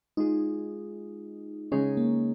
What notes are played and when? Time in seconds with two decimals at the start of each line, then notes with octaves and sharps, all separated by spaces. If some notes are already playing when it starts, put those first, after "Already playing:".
0.17 G#3 D#4 F4 G#4
1.72 C#3 G#3 C#4 D#4 G#4 C#5
1.97 A#3